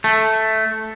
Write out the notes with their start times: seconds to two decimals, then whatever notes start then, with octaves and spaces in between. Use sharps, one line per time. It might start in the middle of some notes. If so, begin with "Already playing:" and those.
0.04 A3